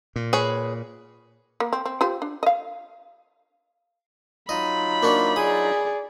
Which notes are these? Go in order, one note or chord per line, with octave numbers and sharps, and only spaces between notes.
A#2
G#4 B4 C#5
A#3
C4
C4
F4 G4 C5
D4
D#5 F5
F#3 D#4 F4 D#5 B5
A#3 D4 F#4
G#4 D5 D#6